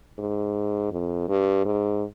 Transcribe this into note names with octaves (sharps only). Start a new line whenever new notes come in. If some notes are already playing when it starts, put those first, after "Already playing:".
G#2
F2
G2
G#2